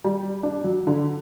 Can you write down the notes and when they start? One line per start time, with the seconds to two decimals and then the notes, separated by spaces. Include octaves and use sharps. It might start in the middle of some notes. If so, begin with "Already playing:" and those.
0.04 G3
0.43 D4
0.64 F#3
0.87 D3